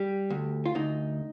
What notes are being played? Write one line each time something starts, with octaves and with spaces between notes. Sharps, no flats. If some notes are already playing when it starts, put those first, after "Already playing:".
Already playing: G3 G4
D2
F4
D2 D#4